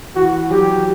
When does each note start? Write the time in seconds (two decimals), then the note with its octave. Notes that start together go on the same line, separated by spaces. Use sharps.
0.16 E3 F#4
0.51 F#3 G4